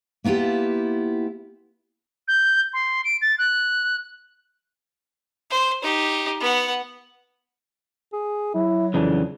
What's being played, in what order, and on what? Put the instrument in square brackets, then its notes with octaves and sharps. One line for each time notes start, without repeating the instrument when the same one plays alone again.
[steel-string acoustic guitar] A#3 B3 E4 F4 G4
[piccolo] G6
C6
D7
A6
F#6
[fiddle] C5
D#4 G4
B3 F#5
[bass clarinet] G#4
[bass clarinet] F#3 [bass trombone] E4
[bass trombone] F2 [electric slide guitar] C#3 E3 D4